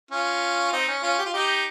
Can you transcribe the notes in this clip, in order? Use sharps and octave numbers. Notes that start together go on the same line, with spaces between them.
C#4 F4
C4 D#4
C#4
C#4 F4
G4
F4
D#4 G4